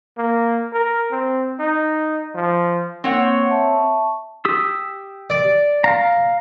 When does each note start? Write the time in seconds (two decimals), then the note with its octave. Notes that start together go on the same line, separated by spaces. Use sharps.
0.17 A#3
0.73 A#4
1.11 C4
1.59 D#4
2.35 F3
3.04 A#3 C4 C#5 F#5
3.49 E5 A5 C#6
4.45 G4 D#6 E6
5.30 D5
5.84 F5 A#5